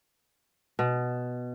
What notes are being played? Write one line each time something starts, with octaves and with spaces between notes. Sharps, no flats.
B2